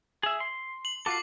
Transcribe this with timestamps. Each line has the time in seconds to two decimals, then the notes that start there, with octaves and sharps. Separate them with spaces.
0.23 G#4 E5
0.40 C6
0.85 F#7
1.06 F4 F#4 A4 D6 C7